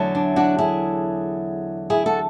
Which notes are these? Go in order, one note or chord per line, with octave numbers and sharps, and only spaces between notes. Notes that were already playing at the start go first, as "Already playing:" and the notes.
Already playing: E2 D3 F#3 A3
D4
D4 F#4
E4 G#4
E4 G#4
F#4 A4